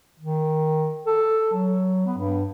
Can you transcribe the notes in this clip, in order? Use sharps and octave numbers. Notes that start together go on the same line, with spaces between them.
D#3
A4
F#3
B3
G2